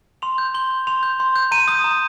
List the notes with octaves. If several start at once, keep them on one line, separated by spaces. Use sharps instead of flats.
C6 F7
G6
C6 G7
G6
C6 F7
G6
C6
G6
A#5 D#7
D#6 G6
A#5